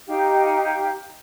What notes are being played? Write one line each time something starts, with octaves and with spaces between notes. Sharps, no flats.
D#4 G4 F5 G5